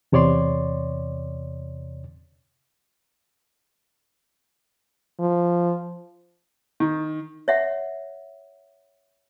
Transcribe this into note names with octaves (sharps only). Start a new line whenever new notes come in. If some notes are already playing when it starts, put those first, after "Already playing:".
E2 C3 C#5 D5 C6
F3
D#3
C#5 E5 F#5